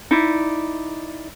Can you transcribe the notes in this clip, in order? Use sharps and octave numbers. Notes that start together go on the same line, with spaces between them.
D#4 E4 D5